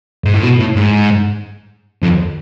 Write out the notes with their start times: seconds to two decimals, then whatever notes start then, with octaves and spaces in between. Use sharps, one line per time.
0.24 G#2
0.34 A2
0.43 B2
0.59 A2
0.76 G#2
2.03 F2